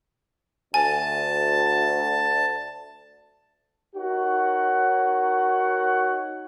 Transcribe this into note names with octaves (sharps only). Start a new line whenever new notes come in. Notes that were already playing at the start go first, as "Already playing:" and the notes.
D2 G#5 A5
D#4 F#4 A#4 C#5 F#5